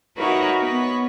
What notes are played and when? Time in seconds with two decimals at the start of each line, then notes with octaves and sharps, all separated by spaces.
0.17 D#4 E4 F#4 A#4 B4 C#5
0.60 B3 B4 C#5